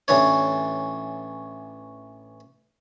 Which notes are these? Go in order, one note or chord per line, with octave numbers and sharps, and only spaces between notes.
A1 E3 D4 C#5